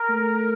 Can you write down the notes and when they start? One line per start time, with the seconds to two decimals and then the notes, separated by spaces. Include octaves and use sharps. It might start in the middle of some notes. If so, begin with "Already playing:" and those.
Already playing: A#4
0.10 A3